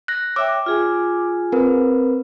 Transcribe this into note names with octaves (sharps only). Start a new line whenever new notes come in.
F#6 A#6
C#5 E5 G5 D6 E6
F4 G#4 G#5
C4 A#4 B4